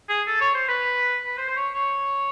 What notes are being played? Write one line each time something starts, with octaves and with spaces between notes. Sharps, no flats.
G#4
A4
C#5
C5
B4
B4
C5
C5
C#5
C#5